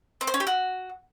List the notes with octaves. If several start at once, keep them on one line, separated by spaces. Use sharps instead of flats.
C4
C5
C#4
G4
F#4